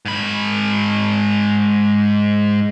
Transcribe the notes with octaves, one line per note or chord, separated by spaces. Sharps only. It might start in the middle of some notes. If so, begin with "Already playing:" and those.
G#2 B5